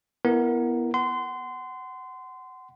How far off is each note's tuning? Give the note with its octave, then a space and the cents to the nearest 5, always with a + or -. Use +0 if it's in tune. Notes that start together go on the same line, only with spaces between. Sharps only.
B3 -10 E4 +15 A#4 +0
F#5 +20 C6 -25